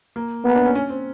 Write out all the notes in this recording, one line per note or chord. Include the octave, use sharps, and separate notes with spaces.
A#3
A#3 B3
D4
C#4
C#4
C4